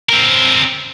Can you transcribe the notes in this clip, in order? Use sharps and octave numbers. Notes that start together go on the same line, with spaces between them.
C4 A#4